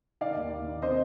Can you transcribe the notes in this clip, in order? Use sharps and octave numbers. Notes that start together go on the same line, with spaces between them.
D#3 D5 F5
D#2
D#2
D#3
C3 C5 D#5